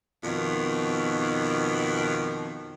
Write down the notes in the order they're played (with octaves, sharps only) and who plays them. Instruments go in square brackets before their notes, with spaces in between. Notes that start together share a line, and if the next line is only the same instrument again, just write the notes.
[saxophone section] F2 B2 D#3